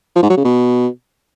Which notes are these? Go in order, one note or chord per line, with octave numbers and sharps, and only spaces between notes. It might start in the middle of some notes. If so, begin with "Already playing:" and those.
F3
G#2
F#3
C#3
B2